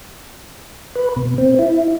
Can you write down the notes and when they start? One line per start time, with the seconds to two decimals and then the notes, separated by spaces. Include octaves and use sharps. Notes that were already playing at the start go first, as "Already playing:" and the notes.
0.95 B4
1.16 B2
1.38 C4
1.59 E4